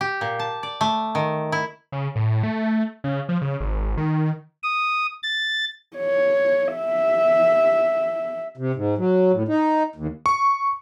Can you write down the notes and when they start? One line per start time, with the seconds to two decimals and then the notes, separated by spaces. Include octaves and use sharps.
0.01 G4
0.21 A#2
0.39 A5
0.63 D5
0.81 A3
1.15 D#3
1.52 E4
1.92 C#3
2.16 A2
2.43 A3
3.04 C#3
3.29 F3
3.42 C#3
3.60 G#1
3.97 D#3
4.63 D#6
5.23 A6
5.97 C#5
6.76 E5
8.57 C3
8.75 G#2
8.98 F#3
9.33 A2
9.48 D#4
9.96 D#2
10.26 C#6